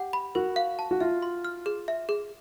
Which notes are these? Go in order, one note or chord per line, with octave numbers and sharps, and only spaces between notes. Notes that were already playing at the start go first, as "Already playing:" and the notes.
Already playing: G4 F#5
B5
F#4 A#4
F5
A5
F#4
F4 E5
C6
F6
G#4
E5
G#4